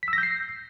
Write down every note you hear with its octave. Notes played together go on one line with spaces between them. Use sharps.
B6
E6
A#6
G6
C7